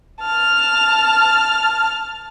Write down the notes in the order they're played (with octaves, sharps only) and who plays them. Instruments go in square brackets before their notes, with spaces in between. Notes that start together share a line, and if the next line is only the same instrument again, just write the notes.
[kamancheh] A5 F6